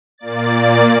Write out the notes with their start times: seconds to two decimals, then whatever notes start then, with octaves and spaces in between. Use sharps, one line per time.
0.18 A#2 A#3 D5 A6